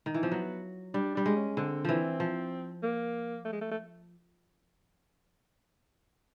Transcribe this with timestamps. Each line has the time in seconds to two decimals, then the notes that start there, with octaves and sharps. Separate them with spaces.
0.06 D#3
0.14 E3
0.23 F3 C4
0.31 F#3 B3
0.94 G3 D4
1.15 G3 D4
1.26 G#3
1.36 C#4
1.57 D3 C4
1.85 E3 F3 C4
2.20 F3
2.83 A#3
3.45 A3
3.53 G#3
3.61 A3
3.71 A3